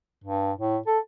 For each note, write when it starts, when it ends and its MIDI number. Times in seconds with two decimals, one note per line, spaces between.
0.24 0.52 43
0.57 0.77 45
0.87 0.99 69